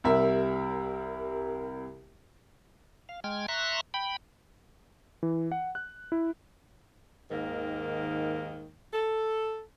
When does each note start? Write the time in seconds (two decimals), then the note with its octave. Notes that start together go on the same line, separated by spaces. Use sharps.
0.04 C2 G3 A#4 E5
3.09 F5
3.24 G#3 G5 F6 G#6
3.48 E5 A#5 C6 C#6 F#6
3.94 G5 B5
5.23 E3
5.52 F#5
5.75 F#6
6.12 E4
7.31 D#2 G#2 D#3 A#3
8.94 A4